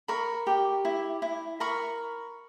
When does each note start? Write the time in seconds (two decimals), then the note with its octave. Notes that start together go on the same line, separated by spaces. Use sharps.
0.08 A#4 B5 C#6
0.47 G4
0.85 E4
1.22 E4
1.60 A#4 B5 C#6